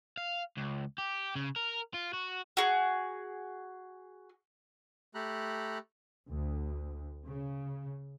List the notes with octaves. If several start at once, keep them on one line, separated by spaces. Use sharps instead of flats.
F5
C#2
G4
C#3
A#4
F4
F#4
F#4 G#4
A3 G4 A4 A#5 B5 F#6
D2
C#3